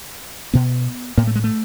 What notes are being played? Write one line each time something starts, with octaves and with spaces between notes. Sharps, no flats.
B2 B3
A2 A#3
A3
G#3
A3